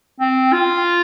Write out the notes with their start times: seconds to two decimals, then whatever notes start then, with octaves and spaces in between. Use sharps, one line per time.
0.20 C4
0.53 F4